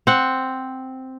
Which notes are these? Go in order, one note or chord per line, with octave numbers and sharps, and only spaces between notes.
C4 F#5